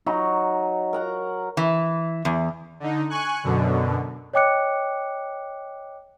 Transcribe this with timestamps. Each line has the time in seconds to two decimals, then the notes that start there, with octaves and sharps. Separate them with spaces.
0.06 F#3 D#4
0.93 A#4 F#5 A#5
1.57 E3
2.25 E2
2.80 D3 D#4
3.10 G#5 C#6 F#6
3.43 F#2 B2 D3
4.34 C#5 D#5 G5 D6 F#6 C#7